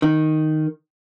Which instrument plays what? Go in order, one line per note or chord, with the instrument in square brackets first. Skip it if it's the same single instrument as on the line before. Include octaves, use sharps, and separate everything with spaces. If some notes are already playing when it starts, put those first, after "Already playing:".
[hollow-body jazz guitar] D#3